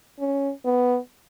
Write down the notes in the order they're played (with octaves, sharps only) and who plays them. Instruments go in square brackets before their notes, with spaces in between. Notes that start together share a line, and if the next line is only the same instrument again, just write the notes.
[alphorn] C#4
B3